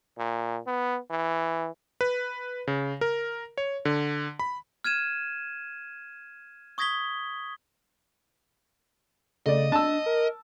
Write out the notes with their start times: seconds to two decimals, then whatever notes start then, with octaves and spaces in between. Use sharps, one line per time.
0.18 A#2
0.67 B3
1.10 E3
2.01 B4
2.67 C#3
3.01 A#4
3.58 C#5
3.85 D3
4.39 B5
4.84 F6 G#6 D#7 E7
6.78 C#6 D#6 G#6 A#6 B6 G7
9.46 C#3 A3 D5 D#5
9.72 D4 A5 E6
10.06 A#4